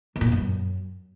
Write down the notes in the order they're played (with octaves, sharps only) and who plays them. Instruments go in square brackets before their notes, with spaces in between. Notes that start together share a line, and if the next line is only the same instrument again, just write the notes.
[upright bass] E2
A#2
E2
G2
F#2